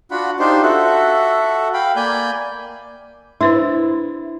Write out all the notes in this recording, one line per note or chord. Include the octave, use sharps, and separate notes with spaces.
D4 F4 F#4 F#5 B5
D4 D#4 F4 G4 C5
F#4 A4 E5 F#5
F5 G5 B5
A#3 D5 G#5 B5 G6
D4 E4 B4 C5